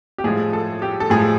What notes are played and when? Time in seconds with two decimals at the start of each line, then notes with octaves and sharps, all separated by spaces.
0.18 G4
0.24 A2 F3 G#3 G#4
0.53 A4
0.82 G4
1.00 A4
1.10 A2 F3 G#3 G#4